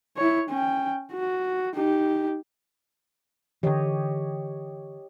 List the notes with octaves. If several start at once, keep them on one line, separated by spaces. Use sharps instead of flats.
E4 C#5
C#4 G5
F#4
D#4 G4
D3 E3 G4 C#5 D#5